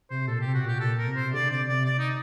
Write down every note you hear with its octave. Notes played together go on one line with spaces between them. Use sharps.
C3 C5
A#2 A4
G4
C3
F#4
A#2 G4
A#2 A4
A#4
C3
C5
C3
D3 D5
C3 D5
C3 D5
D5
D#4